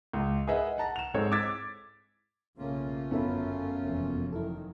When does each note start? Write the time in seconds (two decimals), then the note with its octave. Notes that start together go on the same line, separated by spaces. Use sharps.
0.13 C#2
0.47 G#4 A#4 B4 D#5 E5 F#5
0.78 F#5 A5 A#5
0.96 E7 F7
1.14 G#2 G#3 C4 A4 C#5
1.32 D6 E6 G#6 A6 B6
2.58 B1 C#3 A3 A#3 C#4 F4
3.11 G1 F#2 B3 A4 E5 B5
3.82 F1 E2 A#3
4.32 D#3 E3 F#3 E4 A4 A#4